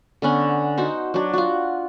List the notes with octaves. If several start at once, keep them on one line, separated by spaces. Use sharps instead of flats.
D3 B3 C#4 D4
D#4 F#4 C5
F#3 D4
F4 F#4